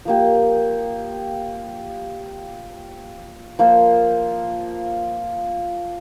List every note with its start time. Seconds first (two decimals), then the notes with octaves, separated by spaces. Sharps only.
0.05 F3 A#3 G4
3.59 F3 A#3 F4 C5